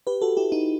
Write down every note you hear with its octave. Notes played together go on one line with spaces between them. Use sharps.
G4 B4
F#4 A4
E4 G4
D#4 F#4